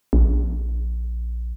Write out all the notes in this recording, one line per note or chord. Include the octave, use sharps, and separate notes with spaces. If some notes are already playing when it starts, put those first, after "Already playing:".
A#1